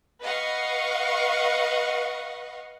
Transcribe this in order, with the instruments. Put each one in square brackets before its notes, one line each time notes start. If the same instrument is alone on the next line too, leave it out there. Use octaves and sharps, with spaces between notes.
[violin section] B4 D#5 F5 F#5 C#6